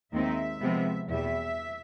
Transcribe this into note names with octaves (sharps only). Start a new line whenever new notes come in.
D#2 D#3 G#3 C4 D#4 E5
C3 F3 G#3 B3
E2 B2 G3 E5